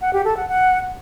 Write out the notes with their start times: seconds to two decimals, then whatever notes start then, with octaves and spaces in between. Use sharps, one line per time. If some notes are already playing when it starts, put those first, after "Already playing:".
0.01 F#5
0.13 G4
0.25 A4
0.37 F#5
0.49 F#5